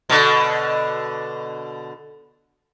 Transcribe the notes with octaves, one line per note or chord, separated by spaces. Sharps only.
B2 D3